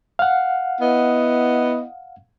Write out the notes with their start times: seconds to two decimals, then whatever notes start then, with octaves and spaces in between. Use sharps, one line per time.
0.19 F5 F#5
0.81 B3 E4 D#5